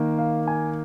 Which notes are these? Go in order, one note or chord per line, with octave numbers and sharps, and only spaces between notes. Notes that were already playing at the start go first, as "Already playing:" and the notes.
Already playing: D#3 A#3
F5
G#5